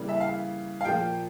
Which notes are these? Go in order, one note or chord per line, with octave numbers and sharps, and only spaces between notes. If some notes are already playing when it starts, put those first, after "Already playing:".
Already playing: C#3 E3 G3 A#3
E5
F5
F5
A#2 F3 A#3 G5